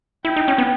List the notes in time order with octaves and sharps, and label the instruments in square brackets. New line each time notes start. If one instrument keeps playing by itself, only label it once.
[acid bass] E4 [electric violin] G5
[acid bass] D#4
C#4
B3